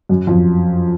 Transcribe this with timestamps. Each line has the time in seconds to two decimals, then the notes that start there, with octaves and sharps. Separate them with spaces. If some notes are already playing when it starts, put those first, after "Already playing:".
0.09 F#2
0.27 F2